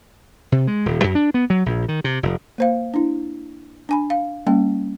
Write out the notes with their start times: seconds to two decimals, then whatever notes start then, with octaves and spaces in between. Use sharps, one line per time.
0.52 C3
0.67 G#3
0.86 D#1
1.04 F#2
1.15 D4
1.34 B3
1.50 F#3
1.66 A#1
1.88 D#3
2.04 C3
2.23 F1
2.58 A#3 C5 F5
2.94 D4 E4
3.89 D4 G#5 B5
4.10 F5
4.47 G3 A#3 C#4 G5